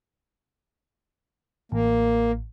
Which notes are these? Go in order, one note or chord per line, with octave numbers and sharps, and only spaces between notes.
A1 A#3